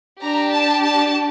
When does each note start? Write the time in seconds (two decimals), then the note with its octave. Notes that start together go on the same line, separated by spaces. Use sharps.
0.21 D4 G4 A#5
0.51 A5
0.83 A5